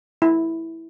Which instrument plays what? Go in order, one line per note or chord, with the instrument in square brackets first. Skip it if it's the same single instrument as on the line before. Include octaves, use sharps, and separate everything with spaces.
[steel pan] E4